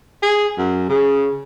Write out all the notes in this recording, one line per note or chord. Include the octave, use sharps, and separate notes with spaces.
G#4
F#2
C#3 G#4